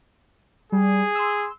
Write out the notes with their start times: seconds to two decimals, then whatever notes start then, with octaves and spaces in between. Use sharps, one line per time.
0.72 G3 G#4
1.15 C6 E6